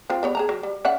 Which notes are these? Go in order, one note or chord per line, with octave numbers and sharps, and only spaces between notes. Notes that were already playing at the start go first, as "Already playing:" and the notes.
C4 F4
G3 B3 C#5
G#4 A5 A#5
F#3
G3
C#4 E5 F#5